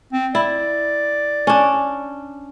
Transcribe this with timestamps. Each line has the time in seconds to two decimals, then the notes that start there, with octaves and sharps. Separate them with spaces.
0.13 C4
0.35 E4 D5
1.47 C#4 D4